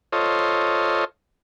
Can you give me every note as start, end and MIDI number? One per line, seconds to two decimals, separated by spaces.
0.13 1.05 65
0.13 1.05 69
0.13 1.05 72
0.13 1.05 73
0.13 1.05 75